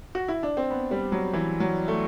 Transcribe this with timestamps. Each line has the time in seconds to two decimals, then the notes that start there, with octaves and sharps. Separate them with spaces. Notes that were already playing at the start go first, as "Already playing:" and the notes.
0.15 F#4
0.28 E4
0.43 D4
0.57 C4
0.70 B3
0.91 G3
1.12 F#3
1.33 E3
1.60 F#3
1.88 A3